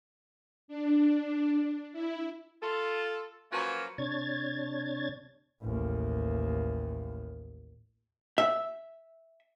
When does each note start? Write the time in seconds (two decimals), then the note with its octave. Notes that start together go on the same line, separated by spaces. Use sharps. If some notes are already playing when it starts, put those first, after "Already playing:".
0.68 D4
1.93 E4
2.62 F4 A4
3.52 F3 F#3 A#3 C#4 F#4 B4
3.98 C3 D4 C#5 G#6 A6
5.62 A1 D#2
8.38 E5